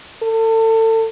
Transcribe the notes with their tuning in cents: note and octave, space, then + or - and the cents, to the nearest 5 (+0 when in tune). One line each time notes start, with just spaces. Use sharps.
A4 +30